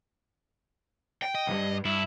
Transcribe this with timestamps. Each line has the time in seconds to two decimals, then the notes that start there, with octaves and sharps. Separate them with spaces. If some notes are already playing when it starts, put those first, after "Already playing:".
1.22 G5
1.35 D#5
1.47 B1 G2
1.85 G2 E4